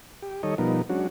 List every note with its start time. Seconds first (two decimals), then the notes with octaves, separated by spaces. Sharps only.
0.22 G4
0.43 D#3 G3 A4 C#5 D#5
0.58 B2 F3 G3 B3 D#4 A#4
0.90 F#3 G#3 C#4 D4 F#4